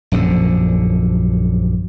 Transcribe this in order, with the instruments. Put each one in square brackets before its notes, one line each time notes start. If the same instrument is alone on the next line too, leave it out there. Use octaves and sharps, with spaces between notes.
[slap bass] A#1 F#2 D3 F3